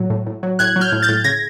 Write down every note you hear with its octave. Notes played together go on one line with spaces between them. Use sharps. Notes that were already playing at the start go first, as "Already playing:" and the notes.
Already playing: A2 F#3
A2
A2
F#3
A2 F#6 G#6
F#3
F6 G6
A2
G6 A6
A2
C#3 G#6 A#6